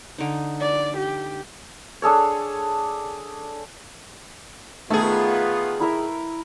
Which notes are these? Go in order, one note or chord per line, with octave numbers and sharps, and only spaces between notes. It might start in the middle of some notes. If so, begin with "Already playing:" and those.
D3 D#4
D5
G4
D4 G#4 A4 C#5
D#3 A3 B3 F4 G#4
E4 A#4 E5